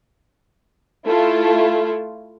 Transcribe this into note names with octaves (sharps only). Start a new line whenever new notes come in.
A3 E4 F4 A4